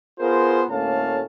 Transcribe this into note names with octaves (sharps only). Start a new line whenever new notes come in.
B3 F4 G#4 A#4 C5
D2 A2 A#3 C#4 F5 A5